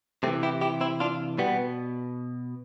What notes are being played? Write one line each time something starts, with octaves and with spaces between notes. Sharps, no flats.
C3 E3 A3 C4
E4 G4
E4 G4
C4 E4
D4 F4
B2 G3 B3